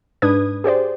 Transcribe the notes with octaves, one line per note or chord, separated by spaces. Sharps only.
G#2 D4 B4 D#6 G#6
G4 G#4 C5 D5